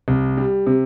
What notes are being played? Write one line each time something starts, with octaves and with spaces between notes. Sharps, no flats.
C2
G3
C3